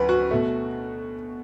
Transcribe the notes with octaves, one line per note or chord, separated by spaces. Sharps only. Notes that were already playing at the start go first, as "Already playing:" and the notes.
Already playing: D2 F#3 B4
F#4
B2 A3